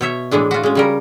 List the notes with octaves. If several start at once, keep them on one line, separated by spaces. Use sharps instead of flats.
B2 C#5 E5
A2 E3 G#3 D4
F4 F#4
G#3 C#4
C#3 G3 A#4